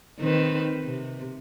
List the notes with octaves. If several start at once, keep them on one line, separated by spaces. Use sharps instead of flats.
D#3 C4 B4
C3